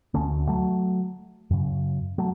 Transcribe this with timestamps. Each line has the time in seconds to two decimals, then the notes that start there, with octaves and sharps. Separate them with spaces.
0.14 D2 D3 A3 C#4
0.48 F#3 A3
1.50 F#2 C#3
2.18 F#3 A3